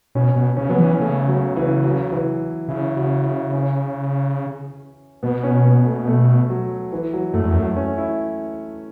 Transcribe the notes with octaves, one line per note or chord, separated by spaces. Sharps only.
B2 C#4
B2
C#3 C#4
F#3 B3
E3
C#4
C#3 A3
F#3
E3
F#3
E3
C#3 E4
F#4
E4
C#4
B2 B3
C#4
B3
A3
A3
F#3
E3
F#3
F#2 A3
E2
F#2 A3
C#4
E4